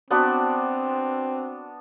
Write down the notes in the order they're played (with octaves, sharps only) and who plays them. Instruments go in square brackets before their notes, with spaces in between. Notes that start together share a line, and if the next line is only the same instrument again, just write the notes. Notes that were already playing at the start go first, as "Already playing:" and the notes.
[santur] B3 D4 F#4 [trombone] C4